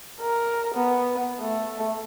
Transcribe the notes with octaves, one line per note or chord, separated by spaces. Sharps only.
A#4
B3
A3